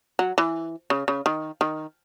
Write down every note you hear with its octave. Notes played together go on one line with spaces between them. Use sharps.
F#3
E3
C#3
C#3
D#3
D#3